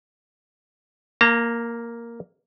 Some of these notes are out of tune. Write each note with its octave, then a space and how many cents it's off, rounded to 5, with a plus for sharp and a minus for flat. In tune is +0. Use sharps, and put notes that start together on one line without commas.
A#3 +0 A#5 -40